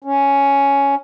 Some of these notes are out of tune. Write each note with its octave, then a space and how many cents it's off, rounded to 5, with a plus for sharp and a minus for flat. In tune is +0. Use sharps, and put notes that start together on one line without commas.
C#4 +5